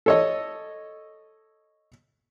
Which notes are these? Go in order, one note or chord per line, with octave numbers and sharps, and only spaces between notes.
A4 C#5 D#5